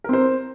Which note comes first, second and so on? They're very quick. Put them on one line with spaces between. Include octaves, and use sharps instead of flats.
A#4 C4 C5